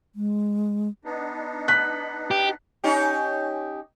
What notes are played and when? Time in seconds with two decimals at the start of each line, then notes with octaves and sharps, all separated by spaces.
0.15 G#3
1.05 B3 D4 D#4
1.68 F#6 B6
2.31 G4
2.84 C#4 D#4 G4